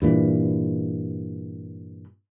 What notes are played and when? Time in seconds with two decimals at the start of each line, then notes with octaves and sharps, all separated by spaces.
0.02 G2 A#2 E3